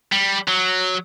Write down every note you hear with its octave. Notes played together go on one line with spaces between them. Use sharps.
G3
F#3